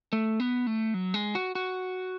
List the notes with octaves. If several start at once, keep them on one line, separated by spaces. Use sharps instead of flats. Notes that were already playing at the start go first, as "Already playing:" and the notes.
A3
B3
A3
F#3
G#3
F#4
F#4